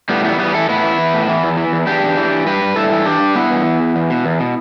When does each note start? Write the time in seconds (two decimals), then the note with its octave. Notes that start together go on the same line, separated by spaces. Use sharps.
0.09 A2 G3 B3
0.25 E3 G3 B3
0.39 E3 G3 B3
0.54 E3 E4 A4
0.69 A2 B3 E4
0.83 E3
0.99 E3
1.13 A2
1.29 E3
1.44 E2
1.57 E3
1.72 E2
1.87 E2 D4 G4
2.03 E2
2.17 E3
2.32 E3
2.46 G2 G4 B4
2.62 G2
2.76 G2 E4 A4
2.92 E3
3.06 E3 D4 G4
3.20 G2
3.35 G2 B3 E4
3.51 G2
3.65 E2
3.80 E2
3.96 E2
4.10 B2
4.25 E2
4.40 B2